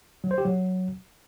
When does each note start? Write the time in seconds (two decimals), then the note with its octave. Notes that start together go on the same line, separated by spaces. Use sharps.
0.24 F#3
0.31 C5
0.38 G4
0.45 F#3